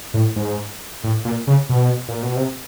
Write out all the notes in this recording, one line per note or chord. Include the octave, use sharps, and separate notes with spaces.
A2
G#2
A2
A#2
C#3
B2
A#2
B2
C3